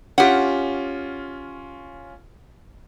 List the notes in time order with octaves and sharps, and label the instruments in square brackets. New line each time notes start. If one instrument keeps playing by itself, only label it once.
[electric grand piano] C#4 F4 [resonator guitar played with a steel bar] G4 F#5